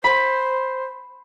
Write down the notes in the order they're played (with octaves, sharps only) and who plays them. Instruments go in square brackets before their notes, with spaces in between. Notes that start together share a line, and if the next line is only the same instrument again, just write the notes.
[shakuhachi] C5 [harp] B5